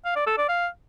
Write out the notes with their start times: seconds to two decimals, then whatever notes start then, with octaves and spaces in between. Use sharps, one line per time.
0.05 F5
0.16 D5
0.27 A4
0.38 D5
0.49 F5